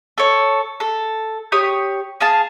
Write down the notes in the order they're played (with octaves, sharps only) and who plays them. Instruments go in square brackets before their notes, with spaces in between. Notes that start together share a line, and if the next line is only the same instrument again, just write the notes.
[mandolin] A4 C#5
A4
G4 C#5 D#6
G#4 F5 A5